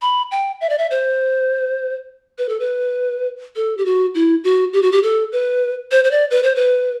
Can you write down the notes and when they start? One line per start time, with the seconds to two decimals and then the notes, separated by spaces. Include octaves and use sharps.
0.02 B5
0.31 G5
0.61 E5
0.70 D5
0.78 E5
0.91 C5
2.38 B4
2.49 A4
2.60 B4
3.56 A4
3.78 G4
3.86 F#4
4.15 E4
4.44 F#4
4.73 G4
4.82 F#4
4.92 G4
5.03 A4
5.32 B4
5.91 C5
6.04 C5
6.11 D5
6.31 B4
6.43 C5
6.56 B4